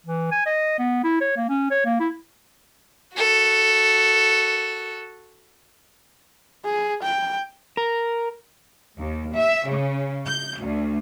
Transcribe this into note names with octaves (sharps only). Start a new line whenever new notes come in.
E3
G#5
D#5
B3
E4
C#5
A#3
C#4
C#5
A#3
E4
F#4 A4
G#4
G5
A#4
D#2
E5
C#3
G6
D2